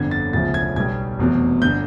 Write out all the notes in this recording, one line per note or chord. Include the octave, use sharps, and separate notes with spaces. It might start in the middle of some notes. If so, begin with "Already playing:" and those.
Already playing: G1 F2 D3 G#6
A6
E1 D2 C#3 F3 A6
G#6
B1 B2 G3 G#6
F1 E2 B2 F#3
G1 D3 G6